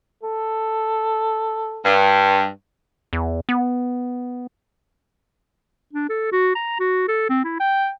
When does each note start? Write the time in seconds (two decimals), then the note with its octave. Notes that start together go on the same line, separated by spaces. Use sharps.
0.23 A4
1.85 G2
3.13 E2
3.49 B3
5.93 D4
6.09 A4
6.32 F#4
6.55 A#5
6.80 F#4
7.08 A4
7.30 C4
7.44 E4
7.60 G5